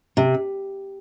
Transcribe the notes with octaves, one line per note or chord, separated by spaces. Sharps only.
C3